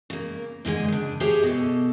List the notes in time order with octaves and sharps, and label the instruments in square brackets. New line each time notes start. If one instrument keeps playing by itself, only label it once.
[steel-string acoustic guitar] C#3 A#3
G#2 D3 G#3 G#5
C#3 D4
G4 G#4 C5 C#5 E5
B2 A4